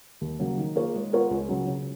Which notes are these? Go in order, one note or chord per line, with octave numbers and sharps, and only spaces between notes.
D#2
C#3 F#3 A#3
D#3
A#3 F4 G#4 C#5
G#3
B3 F4 A#4 C#5
C#2
C#3 F#3
C#3